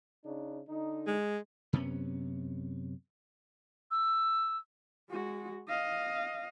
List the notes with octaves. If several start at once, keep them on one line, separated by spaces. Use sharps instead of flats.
C#3 D4 D#4
D3 D#4
G#3
F#2 C3 B3 C#4
E6
G#3 F#4
D#5 F5